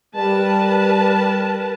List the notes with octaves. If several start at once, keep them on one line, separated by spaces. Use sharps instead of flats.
G3 A#4 B4 A5